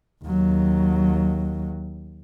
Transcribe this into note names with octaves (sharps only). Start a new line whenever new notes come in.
D#2 F#3